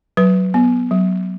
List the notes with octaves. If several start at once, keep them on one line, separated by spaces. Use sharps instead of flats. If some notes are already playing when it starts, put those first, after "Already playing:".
F#3 B4
B3
F#3